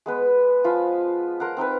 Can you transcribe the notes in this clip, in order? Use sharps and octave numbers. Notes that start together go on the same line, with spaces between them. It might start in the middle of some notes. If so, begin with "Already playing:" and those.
G#3 B3 B4
F3 F4 G#5 B5
A#4 C5 F#5
C4 D#4 A#4 B4